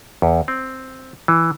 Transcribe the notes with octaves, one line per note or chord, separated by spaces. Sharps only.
E2
C4
E3